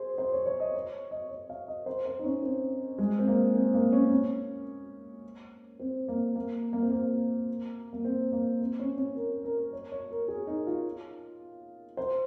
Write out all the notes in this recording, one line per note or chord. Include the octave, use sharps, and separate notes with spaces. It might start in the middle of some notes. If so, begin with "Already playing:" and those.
Already playing: G#4 C5
C5
C#5
C#5
D#5
C#5
D#5
C#5
F5
D#5
C5
C5
D#4
C#4
C4
G#3
C4
A#3
C4
A#3
C#4
C#4
C4
A#3
A#3
A#3
C4
A#3
A#3
C4
A#3
C4
C#4
C#4
A#4
A#4
C#5
C#5
A#4
G#4
D#4
F4
C5